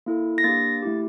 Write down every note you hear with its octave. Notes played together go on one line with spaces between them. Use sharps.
A#3 E4 A4
A#6
A#3 D4 G4 A6
A3 E4 G4